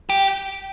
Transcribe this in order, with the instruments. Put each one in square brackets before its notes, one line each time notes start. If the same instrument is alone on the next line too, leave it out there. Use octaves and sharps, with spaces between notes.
[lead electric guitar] G4